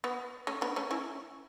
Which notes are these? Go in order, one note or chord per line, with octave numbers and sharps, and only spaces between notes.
B3
A3 C#4
B3 D4
A3 C#4
C#4 E4